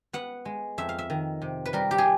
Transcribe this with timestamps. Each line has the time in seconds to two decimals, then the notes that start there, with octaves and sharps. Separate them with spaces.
0.13 B3 F#5
0.45 G#3
0.78 F2 E5
0.89 F5
0.98 E5
1.10 D#3
1.42 C3
1.66 B4
1.73 G3 A#4
1.91 G4
1.98 G#4